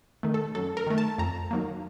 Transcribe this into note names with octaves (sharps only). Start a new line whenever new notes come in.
D#3 A3
A4
F#2 A4
A#4
D#3 A3
A5
F2 A#5
D#3 F#3 A#3